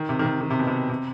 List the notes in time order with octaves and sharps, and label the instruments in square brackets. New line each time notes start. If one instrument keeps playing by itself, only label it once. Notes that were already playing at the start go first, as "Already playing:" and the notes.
Already playing: [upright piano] D#3
C3
D#3
C3
D#3
C3
B2
C3
C3